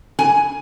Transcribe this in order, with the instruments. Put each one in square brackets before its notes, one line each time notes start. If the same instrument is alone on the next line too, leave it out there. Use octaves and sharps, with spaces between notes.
[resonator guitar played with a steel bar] G#5